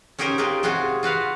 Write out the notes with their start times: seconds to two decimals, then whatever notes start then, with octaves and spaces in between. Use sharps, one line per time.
0.19 C#4 D#4 G4 G#4 A#4 C5
0.38 G#3 A#3 F4 G4 A#4
0.63 C3 G#3 F4 F#4 G#4
1.03 F4 F#4 B4 F5